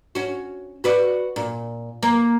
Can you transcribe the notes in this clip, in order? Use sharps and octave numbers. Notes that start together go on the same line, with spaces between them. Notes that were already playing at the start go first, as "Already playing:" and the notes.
C#4 F#4
F#4 B4 D5
A#2
A#3